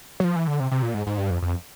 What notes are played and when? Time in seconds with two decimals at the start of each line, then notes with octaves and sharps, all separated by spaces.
0.20 F#3
0.24 F3
0.36 E3
0.47 D3
0.60 C3
0.71 C3
0.82 A#2
0.94 G#2
1.07 G#2
1.18 G2
1.30 F2
1.42 F2